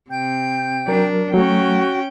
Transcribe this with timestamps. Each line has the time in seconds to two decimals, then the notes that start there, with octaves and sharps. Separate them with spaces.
0.10 C3 G5 G6
0.88 F#3 D4 A#4
1.34 F#3 A3 C#4 F#4 G5